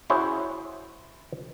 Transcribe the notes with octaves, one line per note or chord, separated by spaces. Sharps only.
C#4 E4 F#4 G#4 C5 C#5